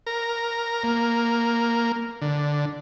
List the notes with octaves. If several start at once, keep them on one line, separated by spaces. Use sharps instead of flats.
A#4
A#3
D3